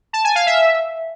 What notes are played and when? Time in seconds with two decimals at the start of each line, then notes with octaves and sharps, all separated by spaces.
0.13 A5
0.24 G#5
0.35 F5
0.46 E5